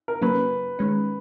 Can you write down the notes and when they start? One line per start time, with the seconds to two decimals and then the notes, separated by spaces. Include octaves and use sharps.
0.08 A#4
0.22 C#3 F#3 A#3 C#4 B4
0.79 D#3 G#3 C#4